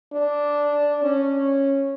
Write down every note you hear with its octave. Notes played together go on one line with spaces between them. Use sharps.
D4
C#4